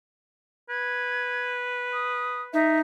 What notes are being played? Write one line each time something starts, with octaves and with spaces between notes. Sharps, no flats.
B4 G#6
D#6
D#4 E5